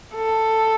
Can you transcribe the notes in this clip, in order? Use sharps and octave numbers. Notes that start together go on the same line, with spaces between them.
A4